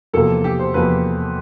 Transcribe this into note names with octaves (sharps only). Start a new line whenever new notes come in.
E2 C3 F3 A#3 A4
G4
C5
E2 C3 F3 A#3 B4